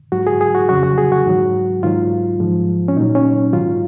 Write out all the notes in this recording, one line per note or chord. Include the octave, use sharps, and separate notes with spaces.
G#2 F#3 F#4
G#4
G#4
F#4
F2 C#3 F#3 F#4
F#4
G#4
F#4
G#2 D#3 F#3
G#2 D#3 F#3 F4
G#2 F3
C#4
A#2 F#3 D#4
C#4
G#2 D#3 F#3 F4